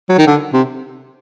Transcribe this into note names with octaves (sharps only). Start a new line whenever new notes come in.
F#3
D#3
D3
C3